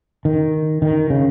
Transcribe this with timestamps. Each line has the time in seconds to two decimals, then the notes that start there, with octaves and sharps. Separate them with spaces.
0.25 D#3
0.82 D#3
1.10 C#3